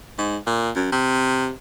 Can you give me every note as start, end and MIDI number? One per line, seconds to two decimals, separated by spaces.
0.18 0.37 44
0.46 0.70 46
0.76 0.88 42
0.92 1.50 48